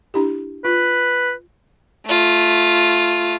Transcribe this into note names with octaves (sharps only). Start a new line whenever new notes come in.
D4 E4 G4
F4 B4
A3 F4